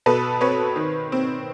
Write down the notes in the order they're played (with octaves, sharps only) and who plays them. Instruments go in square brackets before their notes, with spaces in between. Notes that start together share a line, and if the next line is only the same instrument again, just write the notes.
[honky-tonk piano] B2 A4 B4
C4 B4 C#5
D#3
C4